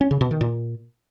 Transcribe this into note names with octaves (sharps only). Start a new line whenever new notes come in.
C#4
C#3
B2
D#3
A#2